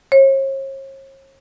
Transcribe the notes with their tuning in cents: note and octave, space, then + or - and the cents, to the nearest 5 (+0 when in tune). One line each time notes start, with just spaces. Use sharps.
C#5 -45